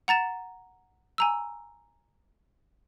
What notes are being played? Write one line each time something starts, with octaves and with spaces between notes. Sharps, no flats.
F#5 A#5 A6 E7
G#5 A#5 E6